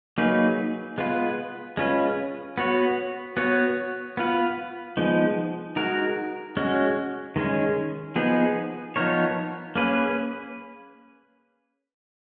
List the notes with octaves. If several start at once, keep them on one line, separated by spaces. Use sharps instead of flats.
F#3 A#3 D#4 G#4 B4
G#3 B3 F4 B4
G#3 C#4 F4 B4
B3 F#4 C#5
B3 F#4 C#5
B3 F4 B4
F3 G#3 B3 D#4
G#3 D#4 F#4 A#4
G#3 C#4 F#4
D#3 G#3 C#4 G#4
F3 B3 D#4 G#4
F3 B3 D#4 A#4 C#5
A#3 C#4 G#4 B4